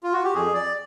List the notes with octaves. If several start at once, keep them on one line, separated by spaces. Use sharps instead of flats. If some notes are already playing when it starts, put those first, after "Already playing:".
F4
F#4
G4
F2 G#4
D5